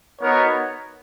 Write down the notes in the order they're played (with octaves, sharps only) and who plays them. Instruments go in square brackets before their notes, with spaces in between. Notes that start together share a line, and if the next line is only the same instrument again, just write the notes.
[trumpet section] B3 D#4 F#4 A#4 C#5